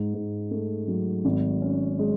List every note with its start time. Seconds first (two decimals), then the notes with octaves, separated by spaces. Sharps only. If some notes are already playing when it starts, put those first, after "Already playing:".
Already playing: G#2
0.14 G#2
0.51 A3
0.88 F#3
1.25 G#1
1.62 C#4
1.99 G#3